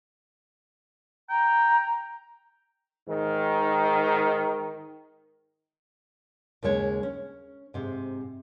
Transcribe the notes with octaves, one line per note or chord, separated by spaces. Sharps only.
G5 A#5
G#2 D#3
D#2 C#3 G#3 C#5
C#4
G#2 C3